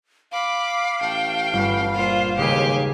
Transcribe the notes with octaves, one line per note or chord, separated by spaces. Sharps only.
F5 B5 D6
A1 A3 G5
G1 B5
A#2 F4 C5
A1 D#2 C#3 G#3 G4 G#5